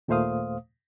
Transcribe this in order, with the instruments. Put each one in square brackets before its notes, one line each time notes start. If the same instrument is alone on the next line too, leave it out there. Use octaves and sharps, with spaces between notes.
[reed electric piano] D#2 A#2 A3 C5 F5 D#6